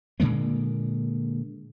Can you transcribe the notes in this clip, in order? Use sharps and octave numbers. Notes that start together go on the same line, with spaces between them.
A#2 D3 G#3 A#3